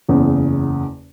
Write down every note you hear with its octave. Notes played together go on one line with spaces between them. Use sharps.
F#1 E2 C#3